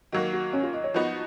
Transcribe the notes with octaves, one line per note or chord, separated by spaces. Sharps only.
D#3 F#3 A#3 F#4
F#4
C#4
F4
D#5
C#5
F3 B3 D#4 F#4 D#5